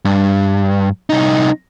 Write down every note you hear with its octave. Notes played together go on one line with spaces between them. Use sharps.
G2
C2 D#4